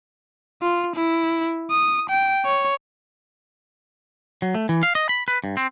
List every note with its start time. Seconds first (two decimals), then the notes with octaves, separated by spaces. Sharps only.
0.62 F4
0.96 E4
1.71 D#6
2.10 G5
2.45 C#5
4.42 F#3
4.55 A3
4.69 E3
4.83 F5
4.95 D#5
5.09 B5
5.28 B4
5.44 G2
5.57 C4